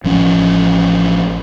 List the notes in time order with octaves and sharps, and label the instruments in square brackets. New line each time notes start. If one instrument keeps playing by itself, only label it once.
[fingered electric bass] A1 F3 C#4